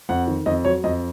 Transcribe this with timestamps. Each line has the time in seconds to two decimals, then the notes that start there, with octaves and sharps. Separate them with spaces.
0.09 F2 F#5
0.27 D#3
0.46 F2 D#5
0.65 F#3 C#5
0.84 F2 D#5